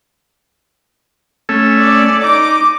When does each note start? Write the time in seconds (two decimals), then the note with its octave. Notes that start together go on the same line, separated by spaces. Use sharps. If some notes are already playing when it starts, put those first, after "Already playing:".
1.49 A3 C#4 A4
1.79 D5
2.23 D#4 D6